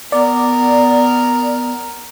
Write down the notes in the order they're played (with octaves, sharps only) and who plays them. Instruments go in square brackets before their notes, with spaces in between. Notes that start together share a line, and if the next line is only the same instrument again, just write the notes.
[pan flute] B3 [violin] A#4 [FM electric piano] D5